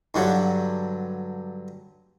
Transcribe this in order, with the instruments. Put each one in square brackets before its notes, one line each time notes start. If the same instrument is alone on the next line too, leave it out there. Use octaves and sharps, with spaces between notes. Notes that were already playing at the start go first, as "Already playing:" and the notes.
[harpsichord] G2 D3 F#3